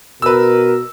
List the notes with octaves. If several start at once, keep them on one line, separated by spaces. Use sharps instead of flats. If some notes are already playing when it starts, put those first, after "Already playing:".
B2 A#4 B4 E6